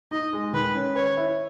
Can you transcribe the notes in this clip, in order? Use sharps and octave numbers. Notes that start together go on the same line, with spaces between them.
D#4 D#5
G#3
D#3 B4
C#4
B4 C#5
E4